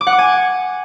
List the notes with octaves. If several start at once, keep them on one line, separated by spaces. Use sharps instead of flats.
D6
F#5
D6
G#5